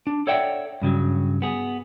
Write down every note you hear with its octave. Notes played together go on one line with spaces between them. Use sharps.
D4
A4 C#5 D5 E5 F#5 G5
G2 C#3 F3 F#3
B3 G#4